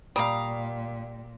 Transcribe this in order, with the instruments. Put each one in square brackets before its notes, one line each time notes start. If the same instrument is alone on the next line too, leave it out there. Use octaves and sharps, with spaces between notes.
[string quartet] A#2 [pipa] G3 [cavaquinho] F5 A#5 D#6